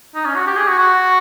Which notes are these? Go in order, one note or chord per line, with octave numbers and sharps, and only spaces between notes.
D#4
C#4
F#4
G4
G#4
F#4
F#4